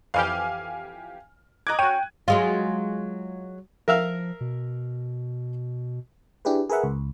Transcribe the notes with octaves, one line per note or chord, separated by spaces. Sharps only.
F2 E3 G4 F5 G#5 F6
D#5 A#5 D6 F#6 G#6
C#4 F#4 G5 D#7
F#3 G#3 F4
F3 A#4 E5 F5
B2
D4 E4 G4 G#4 B4
G#4 A#4 B4 E5 F#5
C#2